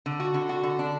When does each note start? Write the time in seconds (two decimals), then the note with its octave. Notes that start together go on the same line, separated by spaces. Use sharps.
0.06 D3
0.20 F#4
0.34 D3
0.49 F#4
0.63 D3
0.79 D4